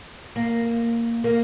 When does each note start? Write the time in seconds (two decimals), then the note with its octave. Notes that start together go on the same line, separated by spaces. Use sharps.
0.36 A#3
1.24 A#3